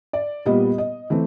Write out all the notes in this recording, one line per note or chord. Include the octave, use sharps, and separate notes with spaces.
D5
A#2 G3 B3 D#5
D#5
E3 A3 C4